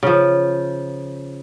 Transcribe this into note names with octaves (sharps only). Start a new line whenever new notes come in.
C#3 F3